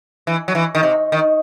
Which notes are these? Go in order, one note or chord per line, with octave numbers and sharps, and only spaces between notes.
E3
F#3
E3
D#3
C3
D#3